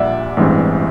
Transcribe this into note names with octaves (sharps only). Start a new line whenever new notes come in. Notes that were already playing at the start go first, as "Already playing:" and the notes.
Already playing: A#1 A#2 G3 D5 E5 F#5
A1 G2 E3 G#3 C4